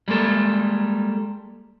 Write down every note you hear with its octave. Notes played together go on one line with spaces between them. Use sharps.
G3 G#3 A#3 A4